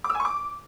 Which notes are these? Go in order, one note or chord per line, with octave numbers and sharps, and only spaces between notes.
D6
E6
G#5
C#6
D6